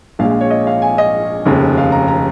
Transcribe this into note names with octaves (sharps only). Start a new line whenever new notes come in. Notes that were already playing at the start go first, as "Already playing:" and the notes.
A#1 A#2 G#3 F5
F5
C#5
D#5
F5
G#5
D#5
F1 D#2 C#3
F5
A#5
A#5